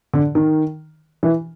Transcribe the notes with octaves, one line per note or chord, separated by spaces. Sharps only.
D3
D#3
E3